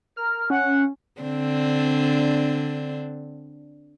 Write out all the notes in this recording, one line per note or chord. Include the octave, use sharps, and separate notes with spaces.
A#4 F6
C#4 F#5
D3 C4 D4